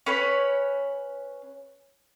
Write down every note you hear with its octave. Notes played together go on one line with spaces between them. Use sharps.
C#4 B4 C#5